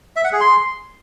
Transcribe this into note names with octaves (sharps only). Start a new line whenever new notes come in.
E5
F#5
G#4
C6